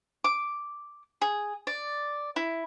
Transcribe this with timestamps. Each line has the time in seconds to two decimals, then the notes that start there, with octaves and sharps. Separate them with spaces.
0.24 D6
1.21 G#4
1.67 D5
2.36 E4